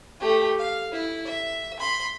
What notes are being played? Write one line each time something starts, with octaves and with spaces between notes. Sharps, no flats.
A3 G4
F5
E4
E5
B5 C6